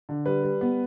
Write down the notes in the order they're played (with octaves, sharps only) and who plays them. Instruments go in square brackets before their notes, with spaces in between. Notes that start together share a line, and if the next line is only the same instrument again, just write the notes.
[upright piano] D3
G3 B4
G3
B3